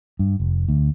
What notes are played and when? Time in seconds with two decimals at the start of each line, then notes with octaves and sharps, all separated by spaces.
0.19 G2
0.40 F1
0.68 D2